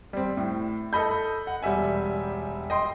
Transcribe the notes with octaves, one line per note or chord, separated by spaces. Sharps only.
G3 C4
A2
A4 D#5 B5 G6
F#5
E1 G3 G4 E5 G#5
D#5 G5 C6